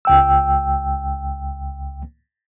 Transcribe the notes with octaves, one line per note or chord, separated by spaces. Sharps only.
C#2 G5 E6